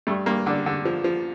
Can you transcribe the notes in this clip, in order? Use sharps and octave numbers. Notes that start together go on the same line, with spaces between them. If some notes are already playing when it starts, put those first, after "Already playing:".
G2 A3
G2 A#3
D3 D4
D3
F3
F3